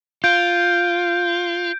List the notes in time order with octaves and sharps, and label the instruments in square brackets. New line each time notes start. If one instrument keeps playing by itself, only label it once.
[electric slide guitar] F4 [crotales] G6 D7